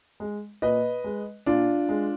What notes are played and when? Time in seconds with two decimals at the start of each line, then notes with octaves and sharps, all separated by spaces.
0.20 G#3
0.62 A#2 B4 D#5
1.04 G#3
1.46 A#2 D4 F4
1.89 G#3